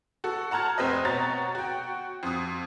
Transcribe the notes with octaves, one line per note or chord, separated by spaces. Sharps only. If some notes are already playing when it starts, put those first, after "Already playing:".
F#4 A4
F#5 A5 A#5 F6 G#6
F1 C4 B4 D#5
B2 F#4 C#5 A#5 A6
F#4 G5
F2 D#6